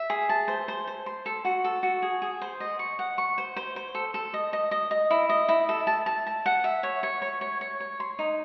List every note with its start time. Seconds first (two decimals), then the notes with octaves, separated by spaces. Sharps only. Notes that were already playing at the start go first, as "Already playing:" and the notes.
Already playing: E5
0.10 G#4
0.29 A5
0.48 C5
0.68 C5
0.87 C5
1.06 C6
1.26 A4
1.45 F#4
1.64 A4
1.83 F#4
2.02 G#4
2.22 G#4
2.42 C5
2.60 D#5
2.79 C#6
2.99 F#5
3.18 C#6
3.38 C5
3.56 C5
3.76 C5
3.95 A4
4.14 A4
4.34 D#5
4.53 D#5
4.71 D#5
4.91 D#5
5.11 E4
5.29 D#5
5.49 E4
5.69 A4
5.87 A5
6.06 A5
6.27 A5
6.46 F#5
6.64 E5
6.83 C#5
7.03 C#5
7.22 C#5
7.41 C#5
7.61 C#5
7.80 C#5
8.00 C6
8.19 D#4